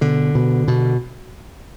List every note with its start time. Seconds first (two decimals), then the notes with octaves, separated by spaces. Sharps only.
0.01 B2 D3
0.35 B2
0.68 B2